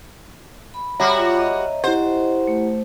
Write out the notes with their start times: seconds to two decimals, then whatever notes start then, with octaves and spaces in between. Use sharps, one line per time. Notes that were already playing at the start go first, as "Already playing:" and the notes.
0.74 B5
1.00 G3 F#4 C#5 E5 A#5
1.18 F4
1.39 D#5
1.84 E4 G4 C5 F#5
2.47 A3